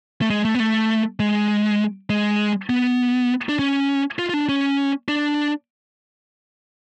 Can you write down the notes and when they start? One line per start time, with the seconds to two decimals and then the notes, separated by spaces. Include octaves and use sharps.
0.21 A3
0.30 G#3
0.45 A3
0.55 B3
0.60 A3
1.20 G#3
2.10 G#3
2.70 B3
3.49 D4
3.59 C#4
4.19 F4
4.29 F4
4.34 D4
4.49 C#4
5.08 D4